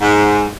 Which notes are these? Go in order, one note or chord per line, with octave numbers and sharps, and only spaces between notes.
G#2